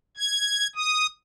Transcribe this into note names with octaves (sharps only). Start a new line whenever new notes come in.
G#6
D#6